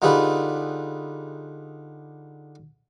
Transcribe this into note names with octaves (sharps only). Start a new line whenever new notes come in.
D3 D#4 F4 G4 G#4 B4